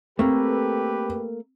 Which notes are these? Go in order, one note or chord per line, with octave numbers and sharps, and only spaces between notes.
A3 A#3 C4 G4 A4 B4